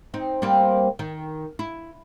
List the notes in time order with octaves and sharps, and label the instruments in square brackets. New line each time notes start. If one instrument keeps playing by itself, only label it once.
[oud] C4 D#4
G3 A#3 C4
D#3
E4